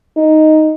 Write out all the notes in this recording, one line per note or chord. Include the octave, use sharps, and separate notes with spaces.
D#4